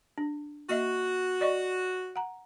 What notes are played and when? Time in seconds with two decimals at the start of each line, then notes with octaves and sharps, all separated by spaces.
0.18 D4
0.69 A#3 F#4 D#5 E5
1.41 D5 D#5 C#6
2.16 F#5 A#5